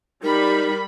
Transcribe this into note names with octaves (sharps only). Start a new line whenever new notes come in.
G3 D#4 A#4 B5